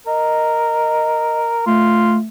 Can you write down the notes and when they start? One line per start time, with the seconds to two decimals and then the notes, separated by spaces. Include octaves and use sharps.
0.07 A#4 D#5
1.66 A3 F4